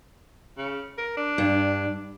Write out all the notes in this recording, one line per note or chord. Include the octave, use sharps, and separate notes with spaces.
C#3
A#4
D4
G2